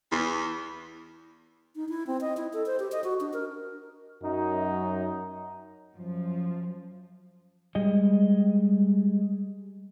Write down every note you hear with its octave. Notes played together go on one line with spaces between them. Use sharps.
E2
D#4
E4
C4
D#5
E4
A4
C5
G4
D#5
F#4
D4
A#4
F#2 D#4
F#2 F3
G3 G#3 D#5